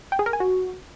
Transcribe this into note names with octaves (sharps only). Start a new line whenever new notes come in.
G5
G#4
A#4
G#5
F#4